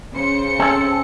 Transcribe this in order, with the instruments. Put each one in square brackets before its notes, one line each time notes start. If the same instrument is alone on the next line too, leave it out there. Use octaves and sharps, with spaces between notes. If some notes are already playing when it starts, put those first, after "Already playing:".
[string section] C#3 C5 C#7
[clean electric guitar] C4 G#4 A4